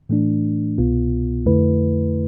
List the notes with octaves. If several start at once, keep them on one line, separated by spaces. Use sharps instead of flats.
A2 E3 A3 D4
C2 B2 B3 F4
F2 D3 A3 E4 B4